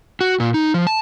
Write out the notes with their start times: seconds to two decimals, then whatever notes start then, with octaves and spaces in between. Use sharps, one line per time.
0.21 F#4
0.40 A#2
0.54 D#4
0.74 F3
0.87 A5